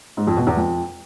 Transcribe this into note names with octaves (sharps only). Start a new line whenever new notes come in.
G#2
F2
B2
E2
F2